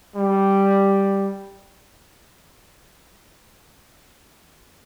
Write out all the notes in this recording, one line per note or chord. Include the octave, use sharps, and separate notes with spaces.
G3